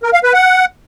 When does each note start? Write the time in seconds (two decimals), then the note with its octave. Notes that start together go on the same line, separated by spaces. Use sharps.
0.03 A#4
0.13 F5
0.23 B4
0.34 F#5